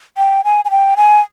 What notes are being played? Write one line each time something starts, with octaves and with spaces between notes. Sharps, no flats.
G5
G#5
G#5
G5
G#5